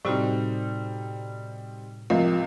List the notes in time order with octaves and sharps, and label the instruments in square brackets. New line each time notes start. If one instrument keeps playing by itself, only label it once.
[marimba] A2 C3 F#4 [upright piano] G3 C4 D#4
[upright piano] C#2 C3 [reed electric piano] F3 F4 [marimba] A#4